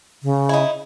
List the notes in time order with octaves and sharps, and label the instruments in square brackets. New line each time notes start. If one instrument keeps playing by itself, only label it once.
[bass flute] C#3
[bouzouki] D#4 E4